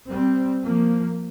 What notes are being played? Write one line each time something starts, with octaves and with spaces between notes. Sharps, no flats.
G3 C4
F3 A#3